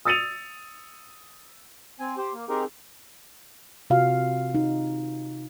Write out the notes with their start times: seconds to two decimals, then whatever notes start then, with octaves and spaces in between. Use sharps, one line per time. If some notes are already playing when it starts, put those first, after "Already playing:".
0.05 D#6 E6 A6 C#7 D#7 F7
2.00 C4 G#5
2.17 G4 C5
2.33 A#3
2.49 C4 D#4 G4 G#4 A#4
3.90 C3 F4 F#4 F5
4.55 D#4